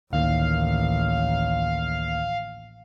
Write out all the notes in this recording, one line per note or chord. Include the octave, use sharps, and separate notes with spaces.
A1 D2 D#3 A#3 F5